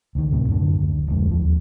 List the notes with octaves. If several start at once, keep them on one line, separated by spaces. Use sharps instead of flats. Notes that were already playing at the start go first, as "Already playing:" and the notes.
D2 D#3
D2 A2 C3
F#2 D3
D2
D1 F2 G#3
D#2 F3